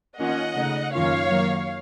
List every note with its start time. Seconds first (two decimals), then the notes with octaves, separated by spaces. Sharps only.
0.19 D#3 A#3 C#4 F4 D#5 F#5
0.55 C#3 A3 D#4
0.93 F#2 D#3 A#3 C#4 F4 C#5 F5
1.30 D#3 F#3 A#3